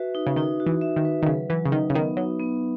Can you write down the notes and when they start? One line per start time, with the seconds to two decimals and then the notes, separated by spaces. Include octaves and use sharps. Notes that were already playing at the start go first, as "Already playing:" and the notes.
Already playing: F#4 B4 E5
0.15 D#4
0.27 C#3
0.36 D#3 D#4
0.60 F#4
0.66 E3
0.81 E5
0.96 D#3
1.05 B4
1.22 D#3
1.26 C#3 F#3
1.50 E3 F#3
1.65 C#3
1.72 D#3 D#4
1.90 C#3
1.95 D#3 B3
2.17 F#3 D#4
2.40 B3